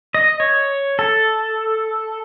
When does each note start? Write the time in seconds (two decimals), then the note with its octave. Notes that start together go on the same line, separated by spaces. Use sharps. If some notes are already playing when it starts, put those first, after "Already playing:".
0.15 D#5
0.40 C#5
0.99 A4